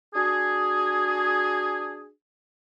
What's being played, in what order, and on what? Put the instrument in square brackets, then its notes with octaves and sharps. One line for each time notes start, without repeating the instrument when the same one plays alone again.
[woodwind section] D4 F#4 G#4